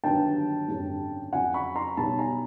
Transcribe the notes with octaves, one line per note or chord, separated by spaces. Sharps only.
G1 G2 D#3 F#3 G5 A5
G#1 F#2 D3 G3
F2 C#3 F#3 F#5 G#5
B5 C#6
A#5 C6
B1 B2 G3 A5 B5
G#5 A#5